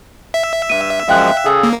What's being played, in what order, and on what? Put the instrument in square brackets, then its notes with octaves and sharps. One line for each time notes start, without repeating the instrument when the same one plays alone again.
[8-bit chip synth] E5
[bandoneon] G2 [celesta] D#7
[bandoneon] F#2 F3 G#3 [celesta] F5 G5 F#6
[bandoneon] C#3 G#4 A4
[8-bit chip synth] A#3